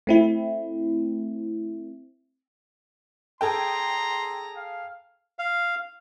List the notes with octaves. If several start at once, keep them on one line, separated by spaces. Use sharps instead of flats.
A3 C4 E4
G#4 A4 G5 A#5 C6
F5
F5